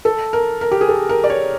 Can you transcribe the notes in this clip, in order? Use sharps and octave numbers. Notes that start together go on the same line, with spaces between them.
A4
A#4
A#4
G4
G#4
A4
A#4
D5
C#5